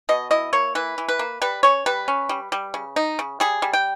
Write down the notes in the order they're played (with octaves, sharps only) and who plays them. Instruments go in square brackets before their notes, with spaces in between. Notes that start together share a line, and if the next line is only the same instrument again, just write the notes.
[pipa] B2 D#5
E4 D#5
A#3 C#5
E3 B4
E3
B4
A#3
G3 B4
C#4 C#5
G3 B4
C#4
G3
G3
C#3
D#4
C#3
G3 G#4
G3
G5